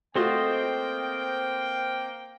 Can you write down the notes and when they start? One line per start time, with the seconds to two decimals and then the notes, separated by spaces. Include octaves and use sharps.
0.16 A3 A#3 C4 F4 F#4 C5 D#5 G5